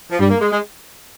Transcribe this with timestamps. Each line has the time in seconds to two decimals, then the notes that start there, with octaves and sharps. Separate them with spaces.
0.11 F3
0.19 G2 G3
0.30 A#3
0.40 G#3
0.51 G#3